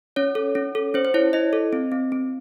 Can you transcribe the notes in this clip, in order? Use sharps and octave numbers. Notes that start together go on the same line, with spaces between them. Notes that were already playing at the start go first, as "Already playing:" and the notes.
C#4 C#5
A4
C#4
A4
C#4 C5
C5
E4 C#5
E4 D#5
A4
C4
C4
C4